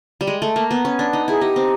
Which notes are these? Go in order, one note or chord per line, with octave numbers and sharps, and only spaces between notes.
G3
G#3
A3
A#3
B3
C#4
D4
D#4
E4 G#4
D#4 G4
C4